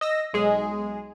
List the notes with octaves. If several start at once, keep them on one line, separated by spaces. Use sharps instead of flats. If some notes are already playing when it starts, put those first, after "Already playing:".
D#5 E6 A#6
B1 G#3 G#4